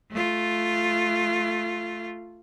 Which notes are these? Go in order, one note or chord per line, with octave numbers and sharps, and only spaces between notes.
A3 F4